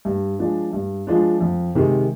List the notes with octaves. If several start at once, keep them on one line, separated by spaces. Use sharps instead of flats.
G2
F3 G#3 D4
G2
F3 G#3 D4
F2
C3 D#3 G#3